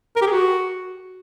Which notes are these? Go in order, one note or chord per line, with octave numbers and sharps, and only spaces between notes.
A#4
G4
G#4
F#4